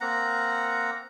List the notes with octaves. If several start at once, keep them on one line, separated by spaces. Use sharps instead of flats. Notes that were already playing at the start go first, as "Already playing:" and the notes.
A#3 C4 F#5 A#5